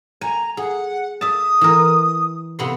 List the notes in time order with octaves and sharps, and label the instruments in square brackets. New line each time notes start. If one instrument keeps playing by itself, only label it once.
[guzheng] G#5 [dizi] A#5
[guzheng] G#4 [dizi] F#5
[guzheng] E5 A5 [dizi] D#6
[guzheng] E3 A#4
C3 B3 C6